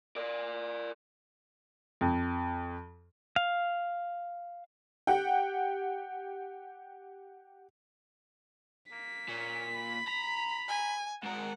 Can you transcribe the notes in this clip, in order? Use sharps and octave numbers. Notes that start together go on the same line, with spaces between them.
A#4 D5
F2
F5
G4 F#5 G5
A#3 B6
A#2 C#4
B5
A#5
G#5
G#2 A#4 F#5